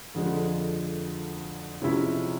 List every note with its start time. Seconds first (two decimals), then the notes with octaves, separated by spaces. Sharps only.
0.14 F2 D3 F3 G#3
1.82 C3 F3 G#3 C#4 E4